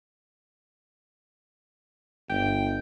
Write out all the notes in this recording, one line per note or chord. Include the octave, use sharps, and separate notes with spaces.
G1 G5